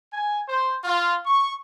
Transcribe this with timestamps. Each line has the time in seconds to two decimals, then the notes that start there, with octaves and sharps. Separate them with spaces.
0.12 G#5
0.47 C5
0.84 F4
1.25 C#6